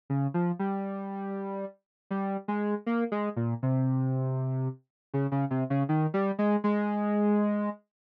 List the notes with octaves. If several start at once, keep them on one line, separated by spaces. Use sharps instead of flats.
C#3
F3
G3
G3
G#3
A#3
G#3
A#2
C3
C#3
C#3
C3
C#3
D#3
G3
G#3
G#3